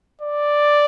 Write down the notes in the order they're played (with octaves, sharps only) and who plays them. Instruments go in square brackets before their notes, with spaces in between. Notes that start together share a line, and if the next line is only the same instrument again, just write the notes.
[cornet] D5